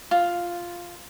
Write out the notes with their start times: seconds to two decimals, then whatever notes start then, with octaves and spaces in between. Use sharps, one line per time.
0.11 F4